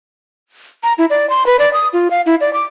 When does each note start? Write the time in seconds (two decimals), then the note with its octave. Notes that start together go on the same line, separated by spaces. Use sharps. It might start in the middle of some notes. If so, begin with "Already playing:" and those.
0.83 A#5
0.98 E4
1.10 D5
1.30 C6
1.46 B4
1.59 D5
1.73 D#6
1.93 F4
2.11 F5
2.26 E4
2.41 D5
2.53 D6